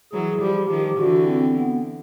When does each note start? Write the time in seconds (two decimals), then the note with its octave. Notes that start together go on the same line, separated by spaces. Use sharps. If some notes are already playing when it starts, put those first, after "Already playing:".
0.12 E3 F#3 G#4
0.41 F3 G3 G4
0.70 D#3 F3
0.97 D3 E3 F#4
1.26 C4
1.55 B3